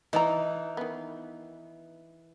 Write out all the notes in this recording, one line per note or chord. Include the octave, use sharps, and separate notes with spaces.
E3 D#4 B4 D5 A#5
D#3 B3